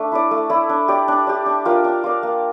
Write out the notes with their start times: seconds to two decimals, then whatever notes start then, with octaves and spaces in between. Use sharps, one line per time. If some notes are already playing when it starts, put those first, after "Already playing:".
Already playing: A3 D4
0.12 E4 A4 D5
0.31 A3
0.50 E4 A4 D5
0.69 D4
0.88 G4 D5
1.08 D4
1.27 G4 D5
1.46 D4
1.65 F4 A#4 D5
1.84 D4
2.04 F4 A#4 D5
2.23 A#3